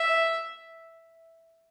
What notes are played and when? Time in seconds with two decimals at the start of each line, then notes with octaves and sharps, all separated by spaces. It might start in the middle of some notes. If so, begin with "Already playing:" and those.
Already playing: E5